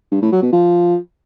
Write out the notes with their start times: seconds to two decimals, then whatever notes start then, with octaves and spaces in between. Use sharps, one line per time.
0.12 G2
0.22 A2
0.32 F#3
0.42 B2
0.52 F3